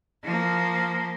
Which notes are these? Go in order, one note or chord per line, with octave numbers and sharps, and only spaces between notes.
F3 A#3